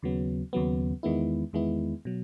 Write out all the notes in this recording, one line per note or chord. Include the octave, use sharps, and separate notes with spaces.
D#2 C#3 F#3 B3
D#2 C#3 F#3 B3
E2 D#3 G#3 B3 E4
E2 D#3 G#3 B3 E4
B2 F#3